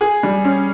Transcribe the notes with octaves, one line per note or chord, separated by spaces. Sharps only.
G#4
G3
C#4